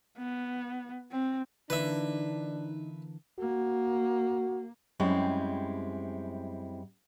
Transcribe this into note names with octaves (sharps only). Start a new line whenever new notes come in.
B3
C4
D3 E3 A#3 D4 D#4 B4 E5
A#3 F#4
F#2 G3 G#3 C4 E4